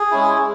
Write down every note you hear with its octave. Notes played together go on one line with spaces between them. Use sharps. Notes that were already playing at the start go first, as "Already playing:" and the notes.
Already playing: G#4
G#3 C#4 E4